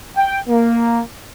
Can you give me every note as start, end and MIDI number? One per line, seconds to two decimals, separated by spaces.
0.17 0.38 79
0.49 1.01 58